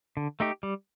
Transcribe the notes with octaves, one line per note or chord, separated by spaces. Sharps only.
D3
A3 D#4 G4
G3